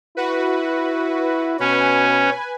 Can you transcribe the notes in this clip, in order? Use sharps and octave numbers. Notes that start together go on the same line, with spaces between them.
E4 F#4 B4
B2 C#4 B4 G#5